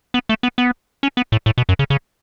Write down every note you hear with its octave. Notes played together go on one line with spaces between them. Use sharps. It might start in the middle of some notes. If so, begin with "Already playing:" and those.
B3
A3
B3
B3
C#4
B3
A2
A2
B2
F#2
C#3
C#3